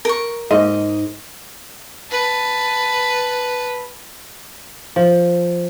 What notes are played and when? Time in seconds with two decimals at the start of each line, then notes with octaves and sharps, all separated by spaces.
0.05 A#4 C#6
0.51 G#2 D#5
2.10 B4 A5
4.96 F3